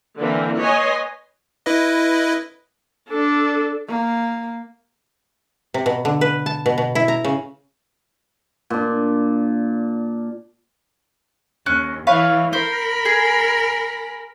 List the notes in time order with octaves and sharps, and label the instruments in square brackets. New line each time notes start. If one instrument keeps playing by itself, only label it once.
[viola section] D3 E3 A#3 C4
B4 C#5 D#5 G#5 C6
[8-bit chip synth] E4 B4 D#5
[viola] D4 A4
[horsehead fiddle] A#3
[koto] C3
B2
D3
B4
A5
B2
B2
E4
A#5
C#3
[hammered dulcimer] A#2 D4
[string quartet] D#2 [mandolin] C#4 F#6
[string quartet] E3 [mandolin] B4 C#5 F5
[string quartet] A#4 B5 [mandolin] C5
[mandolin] G#4